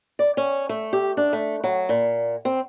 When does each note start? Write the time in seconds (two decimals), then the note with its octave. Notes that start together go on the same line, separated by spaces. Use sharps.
0.19 D5
0.37 C#4
0.69 A3
0.93 G4
1.17 D4
1.33 A3
1.64 F#3
1.89 A#2
2.45 C4